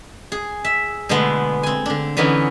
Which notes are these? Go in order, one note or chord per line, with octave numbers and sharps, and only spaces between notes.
G#4
E5
B2 D3 G#3 A3 B3
C4 G#5
D3 D4
D3 E3 B3 C#4 D#4